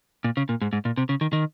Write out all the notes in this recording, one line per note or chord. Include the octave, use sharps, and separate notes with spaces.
A#2
C#3
A#2
G#2
G#2
A#2
C3
C#3
D#3
D#3